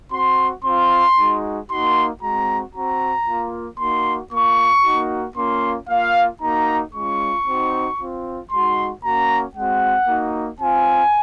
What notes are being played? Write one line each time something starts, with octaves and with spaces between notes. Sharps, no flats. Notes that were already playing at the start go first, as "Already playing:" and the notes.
C4 F#4 C6
C4 F4 C6
G#3 D#4 F#4
A#3 D#4 F#4 C6
G#3 C4 F#4 A#5
C4 F#4 A#5
A#3 F4
A#3 D#4 F#4 C6
A#3 F4 C#6
A#3 D#4 F#4
A#3 C#4 F4 C6
A#3 F4 F5
A#3 D#4 F#4 A#5
G#3 C#4 F4 C#6
C4 D#4 F#4
C4 F4
G#3 D#4 F#4 C6
A#3 C#4 F#4 A#5
G#3 C4 F#4 F#5
A#3 D#4 F#4
C4 F4 G#5